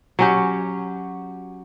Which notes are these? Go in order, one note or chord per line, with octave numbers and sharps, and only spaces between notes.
F#3 C#4 G4